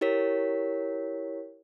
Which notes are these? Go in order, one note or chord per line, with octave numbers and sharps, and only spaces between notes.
E4 G4 A#4 C#5 B6